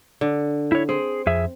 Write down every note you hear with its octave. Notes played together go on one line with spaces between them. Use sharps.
D3
E4 C#5
C4 G#4
F2 G#4 E5